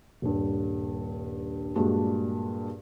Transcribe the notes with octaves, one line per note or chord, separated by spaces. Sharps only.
D#1 G2
G2 A#2 G#3 D4 F#4